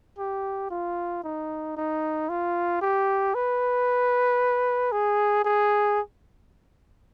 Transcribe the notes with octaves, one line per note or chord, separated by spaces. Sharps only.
G4
F4
D#4
D#4
F4
G4
B4
G#4
G#4